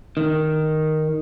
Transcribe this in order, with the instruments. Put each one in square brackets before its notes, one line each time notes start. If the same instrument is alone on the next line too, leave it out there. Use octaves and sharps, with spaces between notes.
[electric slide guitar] D#3